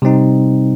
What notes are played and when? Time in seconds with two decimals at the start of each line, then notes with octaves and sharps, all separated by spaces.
0.02 C3 G3 C4 D#4